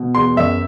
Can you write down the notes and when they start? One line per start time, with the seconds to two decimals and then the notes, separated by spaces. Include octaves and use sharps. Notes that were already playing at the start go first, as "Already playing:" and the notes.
Already playing: B2
0.15 E2 C6
0.37 F#2 E5